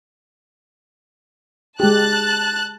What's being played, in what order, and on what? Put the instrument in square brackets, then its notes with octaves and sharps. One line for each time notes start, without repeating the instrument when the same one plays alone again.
[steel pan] G#3 G4 [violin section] A5 F#6 A6